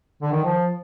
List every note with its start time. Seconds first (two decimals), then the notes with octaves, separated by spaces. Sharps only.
0.22 D3
0.32 D#3
0.44 F3